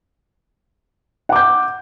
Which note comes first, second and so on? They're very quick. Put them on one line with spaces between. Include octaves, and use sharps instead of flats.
F#5 D6 G6